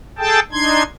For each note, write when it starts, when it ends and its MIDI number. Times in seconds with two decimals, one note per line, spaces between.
0.18 0.40 68
0.18 0.40 69
0.18 0.40 79
0.18 0.40 81
0.52 0.83 62
0.52 0.83 63
0.52 0.83 84
0.52 0.83 92